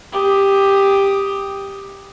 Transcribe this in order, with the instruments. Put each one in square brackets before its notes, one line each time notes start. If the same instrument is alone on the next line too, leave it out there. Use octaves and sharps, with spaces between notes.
[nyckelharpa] G4 D#6